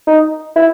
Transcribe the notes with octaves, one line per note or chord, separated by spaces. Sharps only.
D#4
E4